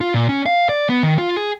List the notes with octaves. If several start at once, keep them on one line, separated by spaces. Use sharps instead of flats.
F4
A#2
C#4
F5
D5
B3
D#3
F4
G#4